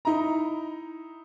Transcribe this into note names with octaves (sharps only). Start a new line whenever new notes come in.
D#4 E4 A#5